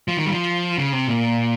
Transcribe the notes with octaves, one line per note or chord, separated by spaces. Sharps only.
F3
D#3
G3
F3
C#3
C3
A#2